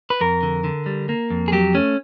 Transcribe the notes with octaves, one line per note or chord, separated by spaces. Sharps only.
B4
F2 A#4
D3
D3
G3
A#3
F2
G#4
F#3 G4
A3 C#4